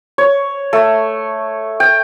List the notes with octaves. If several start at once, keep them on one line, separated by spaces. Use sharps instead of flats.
C#5
A3
G5